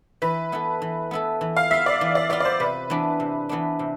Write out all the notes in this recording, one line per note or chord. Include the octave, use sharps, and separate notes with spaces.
E3 B4
B3 E4 A4
E3
B3 E4 A4
E3
F5
B3 F4 E5
D5
E3
D5
B3 F4 D5
D5
C5
C3 B4
E3 B3 D4
C3
E3 B3 D4
C3